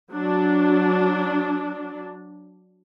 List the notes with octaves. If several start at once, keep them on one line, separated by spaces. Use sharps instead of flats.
F#3 D4